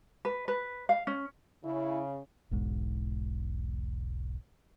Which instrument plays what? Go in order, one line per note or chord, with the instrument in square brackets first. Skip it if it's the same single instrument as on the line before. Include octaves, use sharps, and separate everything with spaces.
[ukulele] B4
B4
F5
C#4
[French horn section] C#3 [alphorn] E4
[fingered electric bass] E1 B1 G#2